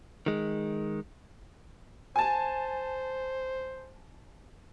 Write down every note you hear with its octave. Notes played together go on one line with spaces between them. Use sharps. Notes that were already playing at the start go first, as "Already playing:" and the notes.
D#3 G#3
C5 G#5 A5